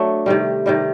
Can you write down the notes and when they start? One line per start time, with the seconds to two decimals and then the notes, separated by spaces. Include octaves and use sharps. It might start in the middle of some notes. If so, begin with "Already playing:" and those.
Already playing: F#3 A3 D4
0.26 C3 D#3 G3
0.66 C3 D#3 G3